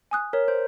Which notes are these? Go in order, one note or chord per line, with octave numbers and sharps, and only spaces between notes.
G#5 D#6 F#6
A#4 C#5
C5